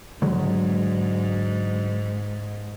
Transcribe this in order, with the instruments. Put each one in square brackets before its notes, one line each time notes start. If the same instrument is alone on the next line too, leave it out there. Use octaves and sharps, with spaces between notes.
[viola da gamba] G#2 [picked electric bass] D3 F#3 G#3